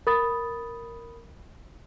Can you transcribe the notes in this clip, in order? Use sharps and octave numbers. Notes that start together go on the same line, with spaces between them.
A#4 B5 D#6 A6